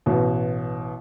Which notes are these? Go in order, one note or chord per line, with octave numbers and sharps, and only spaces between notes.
A1 B2